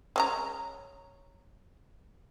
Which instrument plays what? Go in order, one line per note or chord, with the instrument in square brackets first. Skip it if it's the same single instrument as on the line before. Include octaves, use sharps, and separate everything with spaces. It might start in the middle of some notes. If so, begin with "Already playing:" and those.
[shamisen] G#3 C#4 A#5